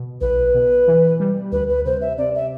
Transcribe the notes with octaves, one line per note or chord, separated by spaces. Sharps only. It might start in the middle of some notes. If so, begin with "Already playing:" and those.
Already playing: B2
B1 B4
B2
E3
G3
D2 B4
B4
C3 C5
E5
C3 D5
E5